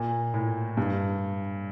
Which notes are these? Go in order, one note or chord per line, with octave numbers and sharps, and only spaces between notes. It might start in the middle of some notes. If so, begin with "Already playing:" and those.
Already playing: A#2
A2
G2